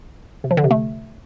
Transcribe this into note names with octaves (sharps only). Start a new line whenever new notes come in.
C3
F3
D3
C3
A3